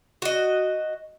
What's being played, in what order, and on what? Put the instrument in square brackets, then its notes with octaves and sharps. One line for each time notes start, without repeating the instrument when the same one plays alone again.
[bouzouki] F#4 D#5